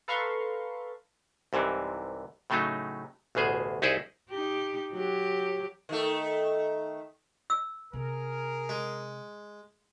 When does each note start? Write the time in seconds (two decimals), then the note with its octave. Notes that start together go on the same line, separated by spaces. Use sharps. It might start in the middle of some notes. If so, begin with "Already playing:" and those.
0.08 A4 B4 F5 A#5 C6 C#6
1.53 C2 G#2 C3 E3
2.50 A2 C#3 F#3 A3 D#4
3.35 A1 D2 B2 G#4 C5
3.82 C2 D#4 E4 G#4 C5 F#5
4.29 D#4 G4
4.92 F#3 G4
5.89 D#3 A3
7.50 E6
7.93 C3 G#4 A#4
8.69 G#3